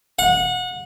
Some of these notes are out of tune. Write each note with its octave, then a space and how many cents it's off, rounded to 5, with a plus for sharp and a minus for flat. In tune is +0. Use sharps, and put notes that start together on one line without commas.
F#5 -30